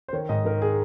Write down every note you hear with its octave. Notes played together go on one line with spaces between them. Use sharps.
C5
D#3 C#5
G#2 D#5
D#3 A#4
G#4